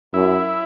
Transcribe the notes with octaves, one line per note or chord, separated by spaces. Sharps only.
F#2 E4